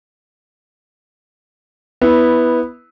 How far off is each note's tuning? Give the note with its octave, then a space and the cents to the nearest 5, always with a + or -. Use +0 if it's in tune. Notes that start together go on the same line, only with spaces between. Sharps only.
B3 -5 E4 -15